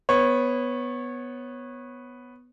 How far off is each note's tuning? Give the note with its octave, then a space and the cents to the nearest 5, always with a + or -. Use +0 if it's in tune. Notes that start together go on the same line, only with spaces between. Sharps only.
B3 +0 C#5 -20